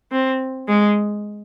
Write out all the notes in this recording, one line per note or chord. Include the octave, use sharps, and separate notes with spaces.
C4
G#3